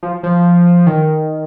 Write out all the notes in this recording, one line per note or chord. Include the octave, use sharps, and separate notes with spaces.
F3
F3
D#3